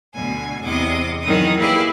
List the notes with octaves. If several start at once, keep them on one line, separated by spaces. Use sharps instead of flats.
D2 B2 G#5
E2 C3 D#5 D6
D#3 E3 F#3 D#4 D#6
A#3 E4 G4 G#4 B4 D5